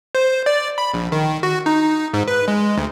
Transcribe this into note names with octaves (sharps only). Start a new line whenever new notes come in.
C5
D5
B5
A#1
D#3
F#4
D#4
G#2
B4
G#3
D2